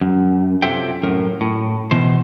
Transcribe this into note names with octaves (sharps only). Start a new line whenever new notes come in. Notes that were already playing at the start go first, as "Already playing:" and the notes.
F#2
C3 F#3 F4 A4 E5 G5
F#2 A2 A#4
A2
B2 E3 C5